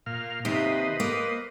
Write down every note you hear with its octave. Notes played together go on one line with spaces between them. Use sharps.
A#2 F5
D#2 C3 G4 B4 C5 D#5
A#3